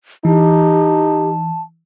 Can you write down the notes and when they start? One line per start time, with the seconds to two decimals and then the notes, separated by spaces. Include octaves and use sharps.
0.25 E3 D#4 G4 A5